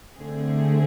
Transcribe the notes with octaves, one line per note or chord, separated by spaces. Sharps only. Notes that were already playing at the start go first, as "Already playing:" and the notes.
D3 A3 C4 G#4